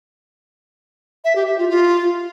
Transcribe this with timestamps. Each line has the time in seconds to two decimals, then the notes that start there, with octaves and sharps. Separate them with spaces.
1.24 E5
1.36 G4
1.47 E5
1.58 F4
1.69 F4